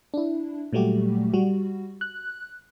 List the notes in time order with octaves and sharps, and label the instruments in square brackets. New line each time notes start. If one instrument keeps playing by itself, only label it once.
[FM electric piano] D4 E4
A#2 F#3 G3 A3 F#4 G4
G3 F#4
F#6